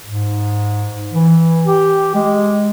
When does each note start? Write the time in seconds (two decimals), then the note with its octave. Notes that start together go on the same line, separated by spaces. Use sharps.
0.04 G#2
1.13 E3
1.66 G4
2.15 G#3